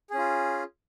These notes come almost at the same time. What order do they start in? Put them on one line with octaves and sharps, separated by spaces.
G#4 C#4 F4